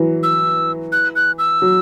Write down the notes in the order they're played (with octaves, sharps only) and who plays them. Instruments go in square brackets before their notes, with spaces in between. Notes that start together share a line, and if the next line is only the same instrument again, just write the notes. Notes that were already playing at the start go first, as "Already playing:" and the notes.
Already playing: [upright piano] E3 F#3
[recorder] E6
F#6
F#6
E6
[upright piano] F#3